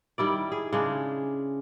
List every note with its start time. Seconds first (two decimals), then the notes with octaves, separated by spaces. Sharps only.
0.18 D#3 G3 E4 D5
0.52 G#4
0.73 C#3 G#3 D4